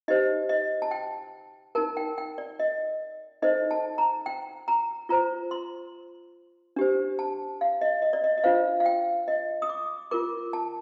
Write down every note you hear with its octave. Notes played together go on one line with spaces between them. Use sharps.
D#4 G4 C5 D#5
D#5
A5
G5
D#4 A#4 A5
G5
G5
D5
D#5
D#4 A4 C5 D#5
A5
A#5
G5
A#5
F4 C5 A#5
C6
D4 G4 C5
A5
F5
D#5
D#5
D5
D#5
D#5
D4 F4 C5 F5
F5
G5
D#5
D#6
D6
F4 A#4 D6
A5